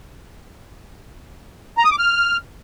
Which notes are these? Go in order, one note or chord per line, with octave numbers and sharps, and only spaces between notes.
A#5
D#6
D6
F6